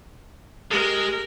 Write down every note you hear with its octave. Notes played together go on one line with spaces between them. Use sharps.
G#3 G4 A#4